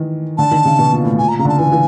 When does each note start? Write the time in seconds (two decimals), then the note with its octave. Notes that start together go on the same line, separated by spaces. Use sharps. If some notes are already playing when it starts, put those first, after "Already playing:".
Already playing: D#3 E3
0.38 D3 A5
0.51 D#3
0.65 C#3
0.79 B2
0.92 A#2
1.05 A2
1.18 A#2 G#5
1.29 A#5
1.39 C#3 A#5
1.45 D3 A5
1.59 E3 G#5
1.72 E3